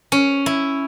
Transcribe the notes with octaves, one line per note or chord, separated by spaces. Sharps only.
C#4
E4